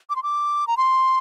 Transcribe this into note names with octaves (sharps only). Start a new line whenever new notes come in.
D6
C6
D6
A#5
C6